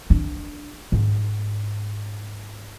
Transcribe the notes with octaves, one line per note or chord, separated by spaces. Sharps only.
D4
G#2